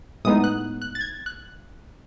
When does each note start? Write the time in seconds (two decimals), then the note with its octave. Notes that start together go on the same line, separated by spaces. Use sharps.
0.25 A2 G#3 B3 D#4 D#6
0.44 F#6
0.82 F#6
0.95 A6
1.01 G#6
1.26 F#6